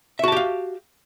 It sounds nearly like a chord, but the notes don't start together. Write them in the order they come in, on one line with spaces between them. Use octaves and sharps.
E5 F#4 A5 G4 F5